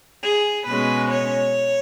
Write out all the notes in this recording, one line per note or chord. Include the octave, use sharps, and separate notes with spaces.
G#4
B2 G#3 C#4 B4
C#5